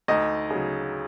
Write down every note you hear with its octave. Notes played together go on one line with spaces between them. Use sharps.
D2 D#4 D#5
C#3 F#3